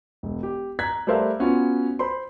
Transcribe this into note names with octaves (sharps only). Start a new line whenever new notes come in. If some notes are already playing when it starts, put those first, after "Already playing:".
E1
G4
A#5 F#6 G#6 B6
G3 A3 A#4 C5 E5 F5
B3 C#4 F4 F#4
C5 B5 C6